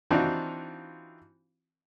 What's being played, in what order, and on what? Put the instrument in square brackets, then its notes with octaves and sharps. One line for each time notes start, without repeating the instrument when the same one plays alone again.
[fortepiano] E3 C4 D4 D#4 F4 F#4